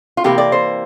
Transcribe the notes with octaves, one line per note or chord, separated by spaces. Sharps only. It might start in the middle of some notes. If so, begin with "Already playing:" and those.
F4
C3 E3 A#3 G4
D5
C5